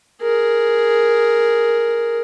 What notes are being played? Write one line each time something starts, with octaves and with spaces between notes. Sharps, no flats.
G#4 A#4